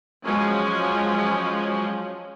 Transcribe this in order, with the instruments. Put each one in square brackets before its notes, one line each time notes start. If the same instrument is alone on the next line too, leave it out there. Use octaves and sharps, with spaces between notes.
[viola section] F3 F#3 G#3 C#4